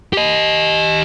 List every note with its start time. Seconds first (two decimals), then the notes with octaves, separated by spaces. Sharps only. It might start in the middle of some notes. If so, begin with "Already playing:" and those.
0.13 G4 D#5